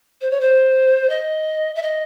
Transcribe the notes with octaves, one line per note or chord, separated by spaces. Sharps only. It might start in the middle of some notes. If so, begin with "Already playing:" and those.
C5
C#5
C5
D#5
E5
D#5